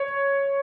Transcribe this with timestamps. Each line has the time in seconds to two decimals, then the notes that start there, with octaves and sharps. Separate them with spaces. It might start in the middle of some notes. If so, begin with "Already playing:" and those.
Already playing: C#5